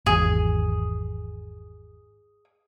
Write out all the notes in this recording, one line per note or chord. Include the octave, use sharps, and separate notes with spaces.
G#1 E2 G#4